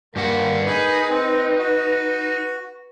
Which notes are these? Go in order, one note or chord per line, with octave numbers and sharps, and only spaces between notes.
G2 A#3 G4 F#5
D#4 G#4 B4 G#5 B5
C4
F#4